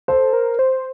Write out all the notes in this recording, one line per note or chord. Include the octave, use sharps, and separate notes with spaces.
A4 C5
A#4
C5